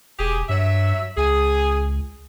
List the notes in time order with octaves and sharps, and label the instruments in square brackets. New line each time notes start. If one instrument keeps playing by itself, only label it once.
[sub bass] E1 [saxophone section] G4 G#4
[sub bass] G2 [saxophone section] F#3 E5
[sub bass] C#2 [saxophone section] G#4